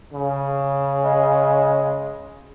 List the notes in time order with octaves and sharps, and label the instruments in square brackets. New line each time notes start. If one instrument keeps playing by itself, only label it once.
[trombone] C#3
[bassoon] G#3